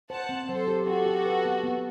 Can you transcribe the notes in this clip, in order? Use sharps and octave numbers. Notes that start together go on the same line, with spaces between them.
C5 F#5 A5
C4
F#3 A4 C5
G4
F#4 G4 A4
G4
B4
B3
B3